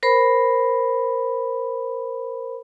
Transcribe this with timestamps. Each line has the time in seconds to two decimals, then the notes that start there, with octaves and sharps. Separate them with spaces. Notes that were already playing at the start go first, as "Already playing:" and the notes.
0.03 A#4 C5 B5